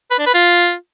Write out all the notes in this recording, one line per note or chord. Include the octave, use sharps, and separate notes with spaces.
B4
D4
B4
F4